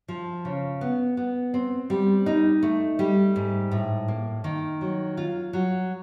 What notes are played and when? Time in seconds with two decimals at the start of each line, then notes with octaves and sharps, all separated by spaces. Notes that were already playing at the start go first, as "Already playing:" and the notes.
0.08 F3
0.45 C#3
0.81 B3
1.17 B3
1.54 C4
1.90 G3
2.26 D#4
2.63 A3
2.99 G3
3.36 G#2
3.71 A2
4.08 A#3
4.44 D#3
4.81 F#3
5.17 F4
5.53 F#3